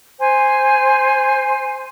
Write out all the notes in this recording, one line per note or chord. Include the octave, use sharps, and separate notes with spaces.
C5 G#5